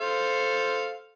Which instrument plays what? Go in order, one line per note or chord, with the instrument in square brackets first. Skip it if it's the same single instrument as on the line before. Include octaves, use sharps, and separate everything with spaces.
[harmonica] A4 C5 F5